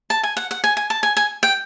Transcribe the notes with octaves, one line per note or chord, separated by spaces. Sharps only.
A5
G#5
F#5
F#5
G#5
G#5
A5
G#5
G#5
G5